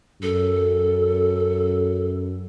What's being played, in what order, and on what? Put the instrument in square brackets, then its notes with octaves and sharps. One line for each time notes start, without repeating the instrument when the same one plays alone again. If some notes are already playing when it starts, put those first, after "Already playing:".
[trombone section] F#2 [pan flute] A4